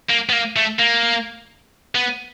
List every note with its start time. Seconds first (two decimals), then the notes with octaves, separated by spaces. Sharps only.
0.10 A#3
0.30 B3
0.33 A#3
0.56 A3
0.79 A#3
1.95 B3